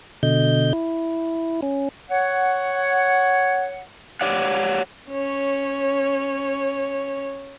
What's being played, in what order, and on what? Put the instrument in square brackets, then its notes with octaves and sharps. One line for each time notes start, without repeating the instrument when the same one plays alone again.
[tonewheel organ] B2 D3 D#5 G6
E4
C#4
[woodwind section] C#5 F#5
[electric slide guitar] G4 C#5 D5 F#5
[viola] C#4 C#5